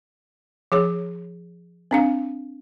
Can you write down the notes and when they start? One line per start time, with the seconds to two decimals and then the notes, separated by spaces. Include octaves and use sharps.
0.72 F3 G#4 C#5
1.91 C4 D4 F5